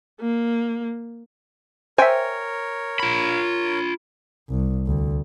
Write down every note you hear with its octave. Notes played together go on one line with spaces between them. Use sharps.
A#3
A#4 C5 C#5 E5 G5 G#5
F4 B5
C2
D2